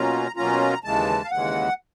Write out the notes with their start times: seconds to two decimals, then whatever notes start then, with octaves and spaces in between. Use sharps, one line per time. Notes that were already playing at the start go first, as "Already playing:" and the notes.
Already playing: B2 F#3 A#3 C#4 F4 A#5
0.36 B2 F#3 A#3 C#4 F4 A#5
0.84 D#2 C#3 E3 G#3 A5
1.24 F5
1.31 D#2 C#3 E3 G#3 F#5